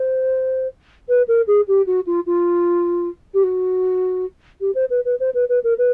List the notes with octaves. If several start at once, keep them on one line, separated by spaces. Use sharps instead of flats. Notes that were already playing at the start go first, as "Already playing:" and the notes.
Already playing: C5
B4
A#4
G#4
G4
F#4
F4
F4
G4
F#4
G4
C5
B4
B4
C5
B4
B4
A#4
B4